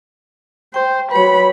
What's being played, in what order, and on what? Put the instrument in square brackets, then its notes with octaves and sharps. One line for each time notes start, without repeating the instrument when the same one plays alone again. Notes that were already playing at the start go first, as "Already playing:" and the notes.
[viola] C5 [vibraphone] G5
[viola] F#3 B5 [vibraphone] B4 C#5